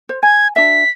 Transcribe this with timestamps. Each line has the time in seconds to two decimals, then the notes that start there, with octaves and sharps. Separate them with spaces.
0.09 C5
0.23 G#5 G#6
0.56 D4 F#4 E5 B6